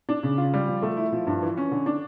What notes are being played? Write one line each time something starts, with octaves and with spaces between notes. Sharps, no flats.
D4
C#3
F4
G3
F3
A3
E4
F3
G2
E3
C#4
D3
D4